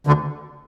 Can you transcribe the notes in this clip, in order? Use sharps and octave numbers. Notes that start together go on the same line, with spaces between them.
D2 D3